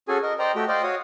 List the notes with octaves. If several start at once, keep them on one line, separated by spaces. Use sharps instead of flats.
C#4 F#4 G#4 A4 G#5
A#4 D#5
C5 D5 D#5 G5 A#5
A3 F#4 G4 G5
C5 D5 D#5 F5 G5
F#4 C#5 F5 D#6